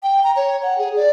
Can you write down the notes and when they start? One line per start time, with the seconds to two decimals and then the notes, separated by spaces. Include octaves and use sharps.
0.03 G5
0.24 A#5
0.36 C#5
0.63 F#5
0.78 G#4
0.96 D5